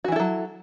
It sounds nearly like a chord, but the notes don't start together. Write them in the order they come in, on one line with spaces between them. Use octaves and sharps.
F#4 E3 E4 A4 F#3